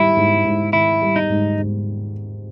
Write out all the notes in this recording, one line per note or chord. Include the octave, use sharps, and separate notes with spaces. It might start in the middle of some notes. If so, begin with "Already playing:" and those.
Already playing: G#2 D#3 G3 E4
G#2
G#2
D#3 E4
G3
D#4
G#2
G#2